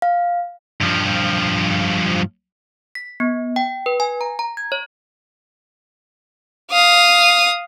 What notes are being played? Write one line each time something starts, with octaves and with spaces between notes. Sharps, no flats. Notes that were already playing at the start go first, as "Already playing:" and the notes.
F5
G2 F3
B6
B3
G5
B4
G#5
A#5
A#5
G#6
C#5
F5 D#6